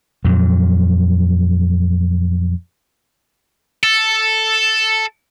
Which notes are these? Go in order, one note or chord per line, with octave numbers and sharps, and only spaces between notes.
F2 A#2 F#3
A4